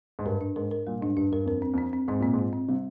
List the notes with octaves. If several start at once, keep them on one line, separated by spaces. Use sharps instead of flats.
G#2
G2 A#4
D4
G#2 A#4
A#4
A#2 G3
G#2 D4
G2 D4
G2 A#4
F2 A#4
C4
F2 C4
C4
G#2 C4
A#2 C4
G#2
F4
C4
C3 G3